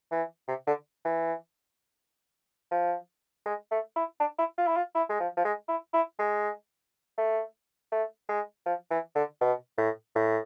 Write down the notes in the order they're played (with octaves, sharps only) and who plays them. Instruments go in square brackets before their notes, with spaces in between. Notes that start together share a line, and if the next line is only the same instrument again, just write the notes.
[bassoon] E3
C3
D3
E3
F3
G#3
A3
E4
D4
E4
F4
E4
F4
E4
G#3
F3
F3
G#3
E4
E4
G#3
A3
A3
G#3
F3
E3
D3
B2
A2
A2